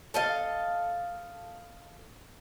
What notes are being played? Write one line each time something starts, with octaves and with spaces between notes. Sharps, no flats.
A4 D#5 F5